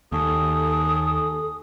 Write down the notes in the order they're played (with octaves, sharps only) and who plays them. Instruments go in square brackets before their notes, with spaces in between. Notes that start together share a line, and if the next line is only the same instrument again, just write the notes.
[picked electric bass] D#2 [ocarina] A4 [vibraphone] G#5 A5 C#6 [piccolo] D#6